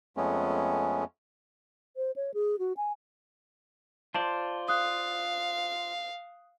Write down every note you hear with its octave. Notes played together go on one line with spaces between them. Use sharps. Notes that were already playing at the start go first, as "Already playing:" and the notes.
F2 G#3 A3 B3 C#4
C5
C#5
G#4
F#4
G#5
F4 C5 D5 A5
F5 D#6 F#6